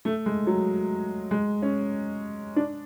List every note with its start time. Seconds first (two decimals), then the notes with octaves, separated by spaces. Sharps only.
0.05 A3
0.26 G#3
0.47 F#3
1.31 G#3
1.62 C#4
2.56 D4